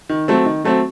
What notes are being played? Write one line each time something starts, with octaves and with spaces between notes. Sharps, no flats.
D#3
F#3 A3 C4
D#3
F#3 A3 C4